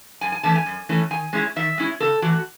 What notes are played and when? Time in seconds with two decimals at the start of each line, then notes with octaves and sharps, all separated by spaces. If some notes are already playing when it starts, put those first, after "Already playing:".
0.21 F#2 G#5
0.32 G#5
0.43 E3 A3 C#4 A5
0.55 G#5
0.66 F#2
0.89 E3 A3 C#4
1.11 D#3 G#5
1.33 G#3 C#4 E4
1.56 D#3 E5
1.78 G#3 C#4 E4
2.00 C#3 A4
2.22 E3 A3 F#4